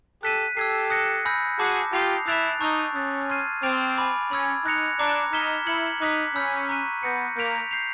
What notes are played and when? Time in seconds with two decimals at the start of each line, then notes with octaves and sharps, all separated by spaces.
0.23 G4 A4 F#6 B6 D#7
0.56 G4 A4 E6 G#6 C7
0.90 D#6 F#6 A#6 C#7
1.25 G#5 B5 E6 G6 A#6
1.59 F#4 G#4 A5 D6 G6
1.92 F4 G4 D#6 G6 C7 F7
2.26 E4 F#6 A6 D7 F7
2.61 D#4 A5 C#6 E6 G6
2.94 C#4 D#6 F#6 A6
3.30 C6 F6 G#6 C7 D#7
3.63 C4 D6 F6 A6 D7 F7
3.98 G#5 B5 D6
4.31 C#4 B5 E6 G#6
4.65 D#4 F#6 A#6 C#7 F7
4.99 D4 A#5 D6 F#6
5.33 D#4 F6 G#6 B6 E7 G7
5.67 E4 F6 G#6 C#7 F#7
6.01 D#4 D6 F#6 B6
6.35 C#4 B5 E6 G6 B6
6.69 A#5 C#6 F#6 B6 D#7
7.03 B3 G6 A#6 C#7
7.37 A#3 G6 B6 D7 F7
7.71 G6 C7 F7